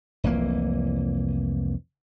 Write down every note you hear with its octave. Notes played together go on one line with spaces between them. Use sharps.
F1 C2 E3 A#3